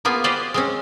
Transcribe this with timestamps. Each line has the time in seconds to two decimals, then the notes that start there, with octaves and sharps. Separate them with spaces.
0.05 A#3 B3 F4 G#4
0.24 G4 B4 C5 D5 D#5 F5
0.54 G#3 C4 C#4